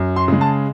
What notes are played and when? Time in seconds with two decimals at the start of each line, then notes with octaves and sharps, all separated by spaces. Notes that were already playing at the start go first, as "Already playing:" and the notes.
Already playing: F#2
0.16 C6
0.28 C#3 G#3
0.41 A5